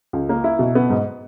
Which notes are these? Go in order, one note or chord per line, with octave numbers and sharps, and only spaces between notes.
C#2
A#3
E4
B2
B3
G#2